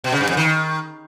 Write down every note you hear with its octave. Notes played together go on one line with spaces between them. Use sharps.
B2
C#3
G2
F2
D#3